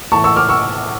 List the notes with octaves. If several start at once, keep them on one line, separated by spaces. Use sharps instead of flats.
A2 E3 A5 C#6
C#6 E6
D6 F6
C#6 E6